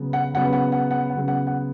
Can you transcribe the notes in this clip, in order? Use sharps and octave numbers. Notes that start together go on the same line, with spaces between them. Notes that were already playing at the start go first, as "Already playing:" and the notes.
Already playing: C#3 F#3 B3
F#5
C#3 F#3 B3 F#5
F#5
F#5
F#5
F#5
C#3 F#3 B3
F#5
F#5